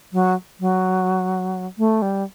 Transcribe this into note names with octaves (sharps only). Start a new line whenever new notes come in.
F#3
F#3
A3
G3